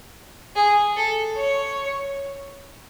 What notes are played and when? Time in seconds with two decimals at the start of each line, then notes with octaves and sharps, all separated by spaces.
0.56 G#4
0.97 A4
1.37 C#5